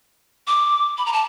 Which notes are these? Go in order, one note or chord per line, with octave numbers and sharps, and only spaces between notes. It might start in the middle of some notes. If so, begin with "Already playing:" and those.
D6
B5
A#5
A5